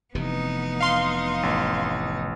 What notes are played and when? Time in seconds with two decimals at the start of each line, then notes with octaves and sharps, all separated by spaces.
0.15 F1 C3 E3 B3 D#4
0.80 F5 C6
1.43 A1